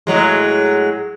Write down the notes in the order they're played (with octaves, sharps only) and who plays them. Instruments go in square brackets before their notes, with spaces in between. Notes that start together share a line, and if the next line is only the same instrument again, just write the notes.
[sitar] A2 F#3 G#3